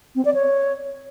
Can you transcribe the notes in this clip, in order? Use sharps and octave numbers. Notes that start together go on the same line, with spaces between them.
C4
D5
C#5